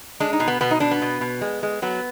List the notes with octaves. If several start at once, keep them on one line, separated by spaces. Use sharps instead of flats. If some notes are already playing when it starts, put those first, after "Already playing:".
G#3 D4
D#4
B2
B3
B2 B3
D#4
B2 D4
B3
B2
B2
G#3
G#3
F#3 B3